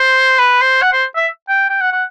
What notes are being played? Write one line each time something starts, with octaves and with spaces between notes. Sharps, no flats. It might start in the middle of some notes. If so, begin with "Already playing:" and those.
Already playing: C5
B4
C5
F#5
C5
E5
G5
G5
F#5
F#5